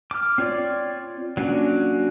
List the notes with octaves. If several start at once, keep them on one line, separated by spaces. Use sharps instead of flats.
D6 F6
C4 F4 C#5 D5
F#3 A#3 C#4 D4 F#4